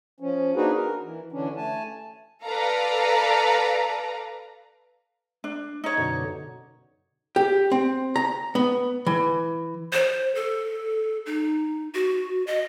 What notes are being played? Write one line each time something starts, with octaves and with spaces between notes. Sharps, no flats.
F3 C#4
A#3 D4 D#4 F#4 G#4 B4
A#4
E3
D3 E3 C#4 D4
A3 G#5 A5
A4 B4 D5 F5 A#5
D4
D#4 C#5
F#2 B2 D3
G4
C4
A#5
B3
E3
C5
A4
D#4
F#4
D#5